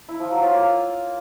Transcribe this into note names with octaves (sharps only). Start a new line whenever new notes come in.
E4
F3
F#3
F4
A#3